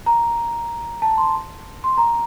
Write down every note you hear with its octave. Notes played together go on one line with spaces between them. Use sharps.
A#5
A5
C6
C6
A#5